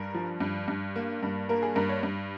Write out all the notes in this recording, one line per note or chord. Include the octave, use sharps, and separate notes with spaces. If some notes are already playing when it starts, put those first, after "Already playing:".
Already playing: G2 A#4
F3
G2
G2
A#3
G2
A#3 A#4
G#4
G2 A#4
C#5
G2